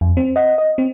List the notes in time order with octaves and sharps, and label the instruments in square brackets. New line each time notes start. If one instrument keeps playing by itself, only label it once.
[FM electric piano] F2
C4
D#5 F#5
D#5
C4